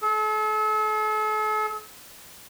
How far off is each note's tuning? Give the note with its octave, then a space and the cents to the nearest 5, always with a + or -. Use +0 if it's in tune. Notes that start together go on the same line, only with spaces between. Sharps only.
A4 -40